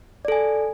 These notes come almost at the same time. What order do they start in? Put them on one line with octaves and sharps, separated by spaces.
D5 A4 G#5